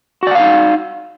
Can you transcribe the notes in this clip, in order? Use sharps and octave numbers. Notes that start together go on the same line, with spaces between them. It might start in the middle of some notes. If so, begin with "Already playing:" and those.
D#4 F#4 D5 F5 F#5